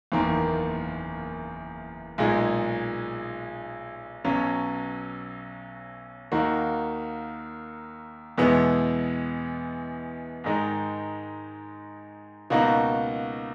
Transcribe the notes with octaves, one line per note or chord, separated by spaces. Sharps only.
F#1 E2 D#3 A#3
B1 A#2 G#3 D#4 G#4
B1 B2 F#3 C#4
D#2 D#3 A#3 D#4 F#4
E2 B2 G#3 B3 E4
G#2 D#3 G#3 D#4
C#2 B2 A#3 D#4 F#4